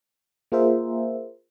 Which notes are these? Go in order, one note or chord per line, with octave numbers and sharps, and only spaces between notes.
A#3 F4 G#4 A#4 C5 E5